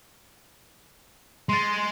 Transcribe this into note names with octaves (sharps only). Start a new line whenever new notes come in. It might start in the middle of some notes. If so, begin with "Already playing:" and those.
G#3 C6 A6